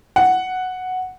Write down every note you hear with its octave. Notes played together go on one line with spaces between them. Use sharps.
F#5